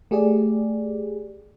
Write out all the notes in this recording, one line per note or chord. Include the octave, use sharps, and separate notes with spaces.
A3 G4 G#4 D5